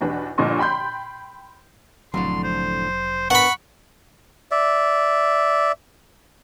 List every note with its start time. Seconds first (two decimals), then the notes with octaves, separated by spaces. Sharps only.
0.01 B1 E2 D4 B4
0.38 G1 A#2 D3 F3 D#5 C#6
0.59 G5 B5 C6 G6
2.14 F1 F2 A2 D3 F#3 C6
2.44 C5
3.30 B3 D4 A#4 F#5 B5 C#6
4.51 D5 E5